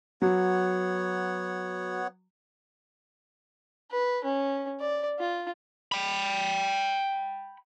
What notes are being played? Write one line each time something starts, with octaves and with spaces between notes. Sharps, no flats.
F#3 B3 C#5 F#5
B4
C#4
D5
F4
G5 B5